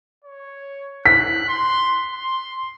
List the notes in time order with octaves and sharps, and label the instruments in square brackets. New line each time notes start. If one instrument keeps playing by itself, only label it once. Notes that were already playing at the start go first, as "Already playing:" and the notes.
[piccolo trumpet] C#5
[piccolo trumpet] F#6 [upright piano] B6
[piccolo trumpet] C6
C6